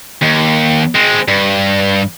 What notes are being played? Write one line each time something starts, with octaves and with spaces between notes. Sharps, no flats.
D#2
G#3 C4
G2